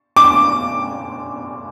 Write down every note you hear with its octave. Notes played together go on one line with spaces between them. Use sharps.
D6